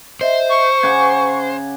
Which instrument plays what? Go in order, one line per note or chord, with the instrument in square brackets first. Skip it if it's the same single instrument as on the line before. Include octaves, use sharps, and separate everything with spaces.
[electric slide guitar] C5 [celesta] D#5 E5
[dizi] C#6
[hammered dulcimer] C#3 F#5 D6 [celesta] G#6